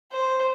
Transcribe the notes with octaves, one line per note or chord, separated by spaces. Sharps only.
C5